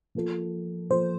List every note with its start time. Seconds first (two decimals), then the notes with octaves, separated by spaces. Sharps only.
0.15 F3 A#3 F4 A4
0.90 F3 A#3 F4 A4 C5